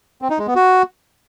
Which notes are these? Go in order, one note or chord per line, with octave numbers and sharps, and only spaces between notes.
C4
D#4
G#3
B3
F#4